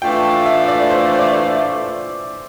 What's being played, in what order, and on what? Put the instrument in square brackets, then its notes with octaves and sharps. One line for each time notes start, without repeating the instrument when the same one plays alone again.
[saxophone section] A2 E3 A3 D4 F4 [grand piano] G5
[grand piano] G5
E5
D5
C5
C5
D5